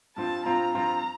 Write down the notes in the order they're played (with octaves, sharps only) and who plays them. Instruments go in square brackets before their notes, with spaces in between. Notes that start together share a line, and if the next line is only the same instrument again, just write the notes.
[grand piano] G2 F3 C4 F4 [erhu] A5
[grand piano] G2 F3 C4 F4 [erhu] A#5
[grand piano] G2 F3 C4 F4 [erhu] A#5